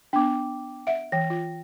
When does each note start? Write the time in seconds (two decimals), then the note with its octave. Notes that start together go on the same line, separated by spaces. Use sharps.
0.13 B3 D4 G5 D6
0.87 E5 F#5 D7
1.12 E3 G5 A#6
1.30 F4